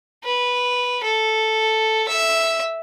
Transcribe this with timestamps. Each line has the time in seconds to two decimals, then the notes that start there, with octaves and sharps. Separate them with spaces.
0.24 B4
1.03 A4
2.08 E5